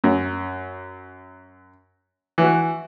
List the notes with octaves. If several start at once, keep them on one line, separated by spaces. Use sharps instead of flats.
F#2
E3 F#4